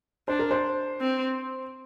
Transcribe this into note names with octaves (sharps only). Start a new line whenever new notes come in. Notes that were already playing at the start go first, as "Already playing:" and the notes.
D4 C5
A#4
C5
C4